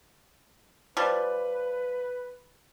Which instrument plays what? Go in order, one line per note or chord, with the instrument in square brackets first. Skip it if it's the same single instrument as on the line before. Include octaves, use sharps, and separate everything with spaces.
[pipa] F3 G3 [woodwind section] B4